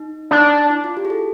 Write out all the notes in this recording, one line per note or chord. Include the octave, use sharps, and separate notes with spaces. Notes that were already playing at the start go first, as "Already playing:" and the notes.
Already playing: D#4
D4
E4
F4
G4
G#4
A4